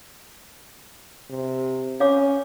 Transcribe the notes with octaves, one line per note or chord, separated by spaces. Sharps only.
C3
C#4 C#5 F5 D6